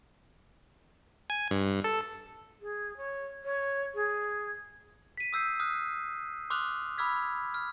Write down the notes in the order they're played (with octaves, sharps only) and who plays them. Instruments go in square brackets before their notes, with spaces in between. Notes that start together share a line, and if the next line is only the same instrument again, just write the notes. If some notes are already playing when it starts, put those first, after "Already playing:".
[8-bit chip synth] G#5
G2
A4
[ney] G#4
C#5
C#5
G#4
[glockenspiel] B6 D#7
D#6 E6 G6 C7
D#6 F6 F#6
C6 D6 D#6 F6 F#6 F7
B5 D6 E6 F6 G#6 B6
F6